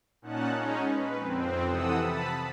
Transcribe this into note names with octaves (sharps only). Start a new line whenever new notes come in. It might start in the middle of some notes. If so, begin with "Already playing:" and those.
A#2 C#4 D#4 F#5 A5 F#6
G#3 C#4 D#4
B4
F2 C4
C3 E3 A4 F#5 D#6 E6
A5 B5